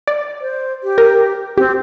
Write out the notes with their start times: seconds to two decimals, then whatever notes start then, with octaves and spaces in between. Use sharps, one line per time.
0.08 D5
0.41 C5
0.84 G4
0.98 A#4
1.58 C4 G4